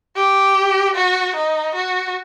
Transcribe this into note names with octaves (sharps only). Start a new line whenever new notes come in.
G4
F#4
D#4
F#4